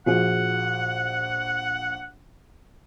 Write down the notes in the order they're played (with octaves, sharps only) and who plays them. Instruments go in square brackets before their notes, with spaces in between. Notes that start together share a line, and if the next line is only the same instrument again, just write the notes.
[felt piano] A#1 [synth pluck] F4 F#4 G#4 [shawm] F#5